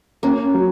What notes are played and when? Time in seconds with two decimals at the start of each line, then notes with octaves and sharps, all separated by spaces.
0.23 A#3 C#4
0.54 F#3